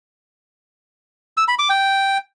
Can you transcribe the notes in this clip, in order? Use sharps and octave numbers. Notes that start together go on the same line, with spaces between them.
E6
B5
D6
G5